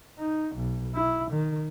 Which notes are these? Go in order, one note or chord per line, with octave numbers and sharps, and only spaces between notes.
D#4
B1
E4
D#3